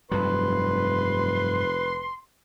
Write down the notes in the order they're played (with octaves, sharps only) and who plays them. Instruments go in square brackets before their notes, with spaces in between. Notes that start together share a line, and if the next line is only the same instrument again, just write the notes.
[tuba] F1 [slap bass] G2 F#3 [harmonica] B4 [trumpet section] C6